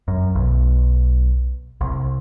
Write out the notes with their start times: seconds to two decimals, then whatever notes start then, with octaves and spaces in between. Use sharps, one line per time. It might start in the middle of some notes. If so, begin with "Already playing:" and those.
0.08 F#2
0.35 B1
1.81 C2